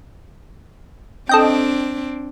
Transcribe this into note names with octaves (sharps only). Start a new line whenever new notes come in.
C4 D4 A4 D#5 G5